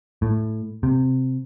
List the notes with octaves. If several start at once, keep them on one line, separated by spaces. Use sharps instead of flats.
A2
C3